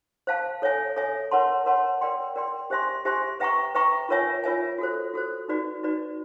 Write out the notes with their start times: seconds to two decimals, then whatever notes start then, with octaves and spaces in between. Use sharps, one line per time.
0.27 C5 F5 A5
0.62 A4 C#5 E5 G#5
0.96 A4 C#5 E5 G#5
1.31 A#4 C#5 F#5 A5 C6
1.66 A#4 C#5 F#5 A5 C6
2.01 A#4 D5 G5 C6
2.36 A#4 D5 G5 C6
2.70 G4 C5 E5 G#5 C6
3.05 G4 C5 E5 G#5 C6
3.40 B4 E5 G5 A#5 C#6
3.75 B4 E5 G5 A#5 C#6
4.09 F4 A#4 C#5 E5 G#5
4.44 F4 A#4 C#5 E5 G#5
4.78 F#4 A4 C5
5.14 F#4 A4 C5
5.48 D#4 F#4 B4 D5
5.83 D#4 F#4 B4 D5